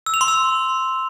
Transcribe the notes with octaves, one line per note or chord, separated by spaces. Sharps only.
E6
F7
C6
E6